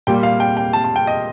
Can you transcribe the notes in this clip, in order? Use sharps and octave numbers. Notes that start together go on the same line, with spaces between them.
A#2 G3 A#3 G5
F5
G5
G5
A5
A5
G5
D#5